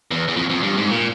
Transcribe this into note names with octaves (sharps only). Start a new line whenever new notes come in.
E2
E2
F2
F2
G2
G#2
A#2